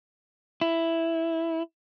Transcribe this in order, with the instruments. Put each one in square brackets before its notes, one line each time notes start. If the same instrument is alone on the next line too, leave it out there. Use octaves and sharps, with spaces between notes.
[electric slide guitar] E4